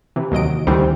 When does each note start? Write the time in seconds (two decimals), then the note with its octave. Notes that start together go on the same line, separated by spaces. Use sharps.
0.16 C3 E3
0.32 D#2 F#3 D#5 D7
0.67 D2 D#3 E3 G3 C4